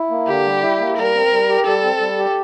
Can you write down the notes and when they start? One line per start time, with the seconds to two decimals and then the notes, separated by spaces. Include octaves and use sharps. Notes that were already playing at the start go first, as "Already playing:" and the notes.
Already playing: E4
0.10 A#3
0.27 D3 G4
0.46 G3
0.63 E4
0.80 A#3
0.97 G3 A#4
1.15 C4
1.32 G3
1.49 G4
1.66 G3 A4
1.84 C4
2.01 G3
2.19 G4